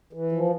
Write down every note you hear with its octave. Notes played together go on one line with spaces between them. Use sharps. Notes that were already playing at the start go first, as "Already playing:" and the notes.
E3
F3